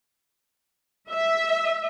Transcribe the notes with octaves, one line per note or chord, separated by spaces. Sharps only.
E5